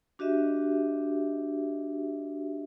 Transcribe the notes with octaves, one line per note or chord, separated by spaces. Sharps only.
D4 F#4 G4 D#5 E5